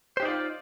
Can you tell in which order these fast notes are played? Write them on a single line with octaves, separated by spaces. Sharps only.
C5 G4 D#4 D5 F4